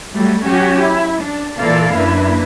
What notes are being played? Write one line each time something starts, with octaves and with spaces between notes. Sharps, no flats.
F#3 G3 A3
F#3 C#4 F#4 G4
E4
D4
A#2 E3 A#3 A4 D5 F5
F#2 A#3 D4 E4 B4